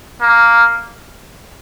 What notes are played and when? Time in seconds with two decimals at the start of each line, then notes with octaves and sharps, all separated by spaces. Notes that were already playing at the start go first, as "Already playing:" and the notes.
0.21 A#3